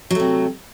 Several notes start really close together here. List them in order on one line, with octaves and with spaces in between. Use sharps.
F#3 A3 C3